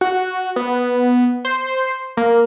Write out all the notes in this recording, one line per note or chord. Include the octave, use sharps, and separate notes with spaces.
F#4
B3
C5
A#3